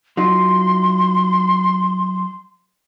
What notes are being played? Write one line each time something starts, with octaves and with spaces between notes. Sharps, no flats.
F#3 D#4 F4 C6